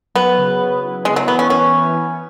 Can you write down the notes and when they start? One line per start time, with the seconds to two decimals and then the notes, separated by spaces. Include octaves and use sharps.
0.15 F#3 B3
0.38 C#3
0.60 B4
0.83 E4
1.05 G#3 B3
1.16 F#3
1.28 E3 B3
1.39 C#4
1.50 C#4 B4
1.73 E4
1.95 B3